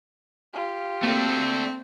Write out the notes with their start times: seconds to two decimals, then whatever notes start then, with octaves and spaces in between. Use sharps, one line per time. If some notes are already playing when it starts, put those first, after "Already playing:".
0.53 F4 G4
1.03 A3 A#3 C4 D4 A4